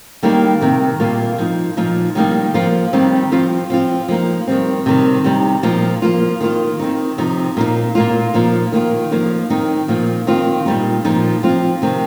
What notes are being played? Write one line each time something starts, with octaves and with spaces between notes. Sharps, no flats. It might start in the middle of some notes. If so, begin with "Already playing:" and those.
D#3 G3 A#3 D#4
C3 D#3 C4
A#2 G3 A#3 F4
F3 D#4
A#2 F3 D#4
D#3 G3 A#3 D#4
F3 A#3 F4
D#3 G3 C4 D#4
F3 C4 F4
F3 C4 F4
F3 A#3 D#4
D#3 G3 C4
C3 D#3 G3
C3 G3 D#4
A#2 F3 D#4
F3 A#3 F4
D#3 A#3 F4
D#3 C4 D#4
C3 F3 D#4
A#2 A#3 D#4
A#2 A#3 F4
A#2 F3 D#4
D#3 A#3 F4
F3 A#3 D#4
D#3 C4 D#4
A#2 F3 A#3
D#3 C4 F4
A#2 G3 D#4
A#2 F3 D#4
F3 C4 F4
C3 D#3 C4